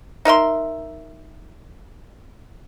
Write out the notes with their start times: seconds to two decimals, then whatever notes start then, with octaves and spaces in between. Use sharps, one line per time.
0.25 D#4 A#4 E5 C6